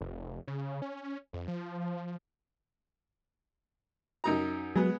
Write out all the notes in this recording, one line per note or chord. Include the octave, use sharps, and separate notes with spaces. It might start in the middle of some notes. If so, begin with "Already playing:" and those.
F1
C#3
C#4
F2
F3
F#2 D#4 A#5
F#3 G#3 B3